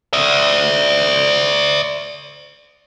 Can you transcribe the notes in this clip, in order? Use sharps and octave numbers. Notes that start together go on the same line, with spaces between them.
D5 E5